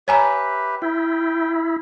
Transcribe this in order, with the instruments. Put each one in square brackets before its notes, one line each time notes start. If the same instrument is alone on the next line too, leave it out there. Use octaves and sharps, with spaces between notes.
[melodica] G4 B4 E5 [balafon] C#5 G#5 A#5
[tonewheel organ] E4 [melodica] G5